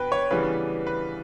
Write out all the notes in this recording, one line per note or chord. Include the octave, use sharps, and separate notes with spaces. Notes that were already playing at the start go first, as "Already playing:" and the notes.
Already playing: B2 B4 G5
C#5
C#3 E3 G3 B3 D4 B4
B4